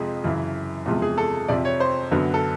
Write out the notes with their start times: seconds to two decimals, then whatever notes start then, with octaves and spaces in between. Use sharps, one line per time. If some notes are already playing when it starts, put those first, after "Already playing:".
Already playing: F2 C3 F3 G#3 G#4
0.24 F#2 C#3 E3
0.86 E2 C3 F3 G#3
1.02 G#4
1.18 A4
1.48 F2 C3 F3 D5
1.65 C#5
1.80 C5
2.11 F#2 D3 F#3 B3
2.34 A4